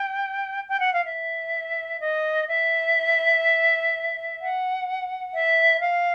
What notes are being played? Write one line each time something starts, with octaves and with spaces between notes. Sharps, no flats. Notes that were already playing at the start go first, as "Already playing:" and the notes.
Already playing: G5
G5
F#5
F5
E5
D#5
E5
F#5
E5
F5